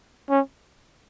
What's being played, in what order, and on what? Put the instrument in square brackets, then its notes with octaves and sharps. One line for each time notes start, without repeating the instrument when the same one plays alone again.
[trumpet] C#4